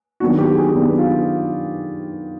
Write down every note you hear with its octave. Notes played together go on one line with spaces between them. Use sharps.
D#3 F#3 B3 D4 F#4
G4
G#4
D#3 F#3 B3 D4
F4